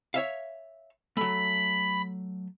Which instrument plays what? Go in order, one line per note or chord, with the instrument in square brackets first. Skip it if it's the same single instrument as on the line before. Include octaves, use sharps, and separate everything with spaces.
[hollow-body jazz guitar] C#5 E5 F5
[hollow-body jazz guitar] F#3 A3 [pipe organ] B5